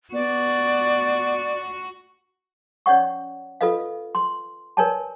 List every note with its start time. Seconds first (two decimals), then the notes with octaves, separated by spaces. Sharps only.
0.14 B3 F#4 D5
2.86 C#4 C#5 D5 F#5 C#6
3.61 F4 A4 B4 D#5 F5
4.15 C6
4.77 A#4 B4 C#5 D5 G#5 A5